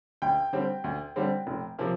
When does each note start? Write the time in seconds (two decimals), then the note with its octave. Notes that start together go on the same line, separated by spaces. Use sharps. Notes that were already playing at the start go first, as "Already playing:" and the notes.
0.22 D2 G5
0.53 D3 G3 C4
0.84 D2
1.16 D3 G3 C4
1.47 F1
1.79 C3 F3 A#3